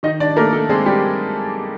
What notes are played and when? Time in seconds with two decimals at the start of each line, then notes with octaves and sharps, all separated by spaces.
0.03 D#3 D#4 D#5
0.20 D4 D5
0.36 A3 A#3 A#4
0.53 A3 A4
0.69 G#3 C4 G#4
0.86 G3 G4